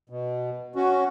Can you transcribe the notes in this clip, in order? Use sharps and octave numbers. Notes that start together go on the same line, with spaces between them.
B2
C#4 F#4